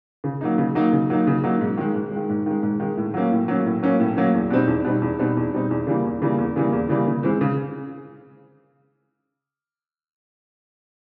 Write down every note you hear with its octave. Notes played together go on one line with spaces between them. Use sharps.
C#3
F#3 A#3 D#4
C#3
F#3 A#3 D#4
C#3
F#3 A#3 D#4
C#3
F#3 A#3 D#4
G#2
D#3 G#3
G#2
D#3 G#3
G#2
D#3 G#3
G#2
D#3 G#3
A2
F#3 A#3 C#4
A2
F#3 A#3 C#4
A2
F#3 A#3 C#4
A2
F#3 A#3 C#4
E2
B2 G3 C4 D#4
E2
B2 G3 C4 D#4
E2
B2 G3 C4 D#4
E2
B2 G3 C4 D#4
E2
C#3 E3 G3 A#3
E2
C#3 E3 G3 A#3
E2
C#3 E3 G3 A#3
E2
C#3 E3 G3 A#3
C#3
E3 G#3 C4
C#3